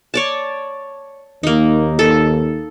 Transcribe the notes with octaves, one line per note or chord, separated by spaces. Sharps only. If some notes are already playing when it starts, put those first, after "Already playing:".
C#5 D5 A5
D#2 A#3 D#4
A4